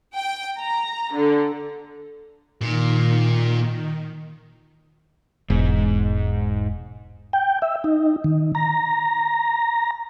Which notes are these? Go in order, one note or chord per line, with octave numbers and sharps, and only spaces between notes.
G5
A#5
D3
A#2 D#3
E1 G#2
G5
E5
D#4
D#3
A#5